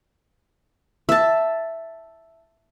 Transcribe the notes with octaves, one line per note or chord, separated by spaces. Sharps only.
E5 A5